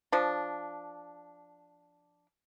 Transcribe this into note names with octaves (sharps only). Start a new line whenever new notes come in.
F3 D4